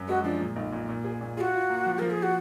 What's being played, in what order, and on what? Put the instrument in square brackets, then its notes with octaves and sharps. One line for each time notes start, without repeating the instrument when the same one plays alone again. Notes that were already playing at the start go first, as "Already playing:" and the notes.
Already playing: [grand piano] F#2
[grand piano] G#3 [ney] F#4
[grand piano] F3 [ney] D4
[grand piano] A#2
B1
A#2
A#2
G#4
A#2
[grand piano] F4 [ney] G#4
[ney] F#4
[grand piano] F4
A#3
F3
[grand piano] F3 [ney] A#4
[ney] G#4
F#4